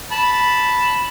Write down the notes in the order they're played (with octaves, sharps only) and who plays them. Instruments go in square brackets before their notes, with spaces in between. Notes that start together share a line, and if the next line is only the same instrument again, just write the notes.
[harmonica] A5 B5